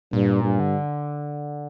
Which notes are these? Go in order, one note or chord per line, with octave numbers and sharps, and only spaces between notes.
G2 A#2
G2
D3